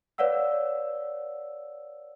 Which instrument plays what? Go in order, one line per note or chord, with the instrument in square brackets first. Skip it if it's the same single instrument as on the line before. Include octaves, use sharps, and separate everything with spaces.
[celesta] B4 C#5 D5 F5 F#5 E6